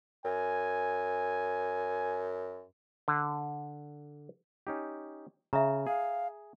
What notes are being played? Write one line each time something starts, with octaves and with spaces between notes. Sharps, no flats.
F#2 G#5
D3
C#4 D#4 G4
C#3 E5 A#5
G#4 F5